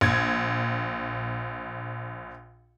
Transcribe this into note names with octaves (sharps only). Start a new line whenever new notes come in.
A#1 G#6